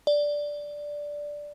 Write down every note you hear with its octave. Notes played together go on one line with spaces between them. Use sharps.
D5